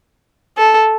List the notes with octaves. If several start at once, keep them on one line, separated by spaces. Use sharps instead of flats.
A4